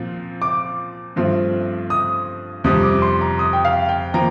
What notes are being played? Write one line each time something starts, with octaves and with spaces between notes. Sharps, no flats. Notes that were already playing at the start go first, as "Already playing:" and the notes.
Already playing: A#2 F3 C4
D6
G2 F3 A3 C4 F4
D#6
F2 C3 G3 D#6
D6
C6
A#5
D#6
G5
F5
G5
F3 A#3 A#5